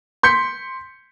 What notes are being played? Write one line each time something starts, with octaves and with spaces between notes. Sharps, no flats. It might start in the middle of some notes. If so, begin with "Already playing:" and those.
C6 G6 B6 C#7